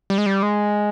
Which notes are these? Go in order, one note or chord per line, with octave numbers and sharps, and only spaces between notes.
G3
G#3
G3
G#3